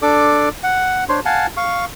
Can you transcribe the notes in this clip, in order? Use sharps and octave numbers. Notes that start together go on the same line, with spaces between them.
D4 A4 D5 D6
F#5
D4 C5 C#5 C6
F5 F#5 G#5 A5
F5 C#6